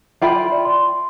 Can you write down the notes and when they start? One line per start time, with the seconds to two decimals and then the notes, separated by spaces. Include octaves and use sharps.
0.22 F4 E5 G5 B5
0.52 D5
0.65 C6